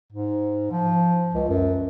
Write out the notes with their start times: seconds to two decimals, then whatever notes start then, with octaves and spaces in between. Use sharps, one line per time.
0.13 G#2
0.72 F3
1.35 C#2
1.49 F#2